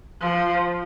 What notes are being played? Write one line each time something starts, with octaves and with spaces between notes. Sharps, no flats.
F3